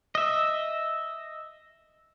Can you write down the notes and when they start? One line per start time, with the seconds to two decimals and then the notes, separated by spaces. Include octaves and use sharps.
0.15 D#5 E5